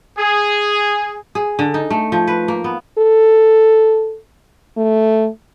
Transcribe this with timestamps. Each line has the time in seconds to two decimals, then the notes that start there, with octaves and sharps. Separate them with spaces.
0.19 G#4
1.35 G#4
1.59 D3
1.74 D#4
1.90 A3
2.12 F3
2.27 B4
2.48 A#3
2.64 B3
2.98 A4
4.77 A3